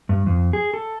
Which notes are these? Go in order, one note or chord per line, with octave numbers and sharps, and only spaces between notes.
G2
F2
G#4
A4